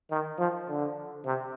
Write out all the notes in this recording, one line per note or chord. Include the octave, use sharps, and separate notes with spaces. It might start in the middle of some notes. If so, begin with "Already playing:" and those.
D#3
F3
D3
C3